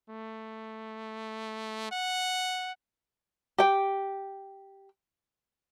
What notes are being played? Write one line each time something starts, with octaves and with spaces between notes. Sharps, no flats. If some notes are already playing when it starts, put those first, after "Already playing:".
A3
F#5
G4 G5